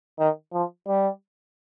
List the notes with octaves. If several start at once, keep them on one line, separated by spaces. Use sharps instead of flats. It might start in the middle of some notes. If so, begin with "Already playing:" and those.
D#3
F3
G3